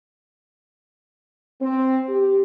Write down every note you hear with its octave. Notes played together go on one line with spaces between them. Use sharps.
C4
G4